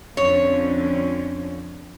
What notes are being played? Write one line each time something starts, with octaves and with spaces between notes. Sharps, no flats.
F2 D3 C#4 C#5